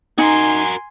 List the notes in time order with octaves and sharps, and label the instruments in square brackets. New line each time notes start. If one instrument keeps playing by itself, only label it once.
[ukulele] D#4 [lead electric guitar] F#4 A#4 [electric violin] G#5 C6